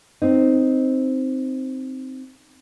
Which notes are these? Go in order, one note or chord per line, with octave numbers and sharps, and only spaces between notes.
C4 D#4